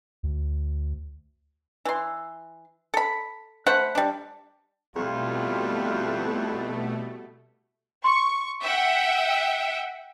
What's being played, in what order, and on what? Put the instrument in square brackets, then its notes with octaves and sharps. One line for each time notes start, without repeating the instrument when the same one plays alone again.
[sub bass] D2
[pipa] E3 C6
A4 B5
A3 C5 F#5 B5
G3 D4
[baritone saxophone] F2 [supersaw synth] B2 A3 [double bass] G3 E4 [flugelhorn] F4
[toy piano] C6 [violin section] C#6
[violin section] E5 F#5 G5